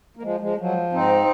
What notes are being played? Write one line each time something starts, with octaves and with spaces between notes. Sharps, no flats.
A#3
F3 G#3
F3 G#3
F3 F#3
G#2 C4 D#4